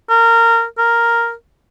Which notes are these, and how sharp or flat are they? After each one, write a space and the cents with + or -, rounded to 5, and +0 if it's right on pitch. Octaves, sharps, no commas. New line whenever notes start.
A#4 -20
A#4 +0